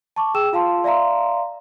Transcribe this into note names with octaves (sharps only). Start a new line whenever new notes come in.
A5 C#6 D6
G#4 G5 E6 E7
F4 F5 A5 C6
D5 E5 F5 A#5 C6